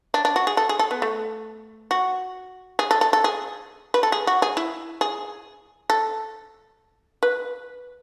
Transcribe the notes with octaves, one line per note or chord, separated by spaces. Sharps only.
D4
D4
F#4
G#4
A4
G#4
A4
B3
A3
F#4
G#4
A4
A4
A4
G#4
B4
A4
G#4
F#4
G#4
E4
G#4
A4
B4